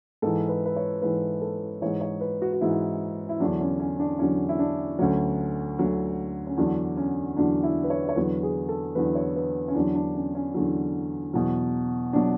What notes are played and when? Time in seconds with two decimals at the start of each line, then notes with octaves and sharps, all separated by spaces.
0.22 G#2 E3 A4
0.49 B4
0.66 B4
0.76 C#5
1.02 G#2 E3 B4
1.41 A4
1.81 G#2 E3 C#5
2.01 C#5
2.21 B4
2.42 F#4
2.53 F#4
2.61 G#2 E3 E4
3.29 E4
3.40 E2 D3 F#3 D4
3.61 C#4
3.79 C#4
4.00 D4
4.19 E2 D3 F#3 C#4
4.49 E4
4.59 D4
4.99 D2 D3 F#3 C#4
5.79 D2 D3 F#3
6.47 C#4
6.57 E2 D3 F#3 D4
6.97 C#4
7.37 E2 D3 F#3 D4
7.63 E4
7.84 B4
7.90 C#5
8.09 C#5
8.16 E2 D3 F#3 B4
8.43 G#4
8.69 A4
8.95 E2 D3 F#3 B4
9.15 C#5
9.36 B4
9.68 C#4
9.74 E2 D3 F#3 D4
9.95 D4
10.15 C#4
10.35 C#4
10.54 E2 D3 F#3
11.33 E2 B2 F#3
12.13 B2 F#3 D4